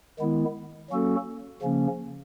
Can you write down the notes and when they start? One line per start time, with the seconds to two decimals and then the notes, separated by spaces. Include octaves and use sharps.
0.20 D#3 G#3 B3 E4
0.90 F#3 A#3 C#4 F#4 A4
1.62 C#3 F3 A#3 C#4